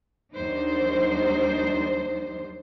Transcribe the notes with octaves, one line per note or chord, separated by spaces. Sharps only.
D#2 F#3 G3 D4 D#4 C5